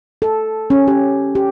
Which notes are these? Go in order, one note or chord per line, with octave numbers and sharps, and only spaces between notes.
A4
C#4
G4
G4